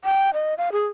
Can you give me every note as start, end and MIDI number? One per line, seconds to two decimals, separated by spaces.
0.05 0.30 79
0.34 0.54 75
0.58 0.70 77
0.72 0.88 68